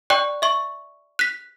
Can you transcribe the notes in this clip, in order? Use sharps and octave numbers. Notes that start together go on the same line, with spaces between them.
D5 G5 C#6 F#6
E5 C#6
F#6 B6